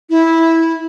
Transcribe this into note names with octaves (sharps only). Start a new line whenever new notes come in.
E4